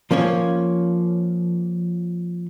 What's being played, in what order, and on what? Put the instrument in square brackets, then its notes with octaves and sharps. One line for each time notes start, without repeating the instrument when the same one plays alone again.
[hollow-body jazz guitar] F3 A#3 C#4 C#5